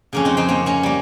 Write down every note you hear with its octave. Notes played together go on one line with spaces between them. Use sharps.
F2 C#3 A#3 C#4
C4 D#4
C4 D#4
A#3 C#4
A#3 C#4
G3 A#3